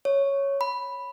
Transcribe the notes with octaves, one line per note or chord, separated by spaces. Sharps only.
C#5
B5